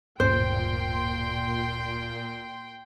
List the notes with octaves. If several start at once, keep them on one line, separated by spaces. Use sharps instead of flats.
D1 G2 A#2 C#4 C5 G5 C6